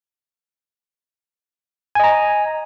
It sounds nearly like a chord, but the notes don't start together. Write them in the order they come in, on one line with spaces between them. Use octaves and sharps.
G#5 D#5 A#5